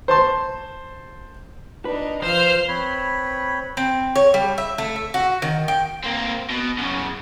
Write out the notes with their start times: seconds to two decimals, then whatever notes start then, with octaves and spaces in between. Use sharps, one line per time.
0.08 C5 A5 C6
1.85 D4 D#4 B4
2.23 F3 C5 F6 C7
2.68 C4 B4 C#5 B5
3.77 C4
4.15 C#5
4.34 G3
4.58 E5
4.78 A3
4.96 E5
5.14 F#4
5.42 D#3
5.68 G5
6.04 A#3 C4
6.50 B2
6.78 F#2 C#3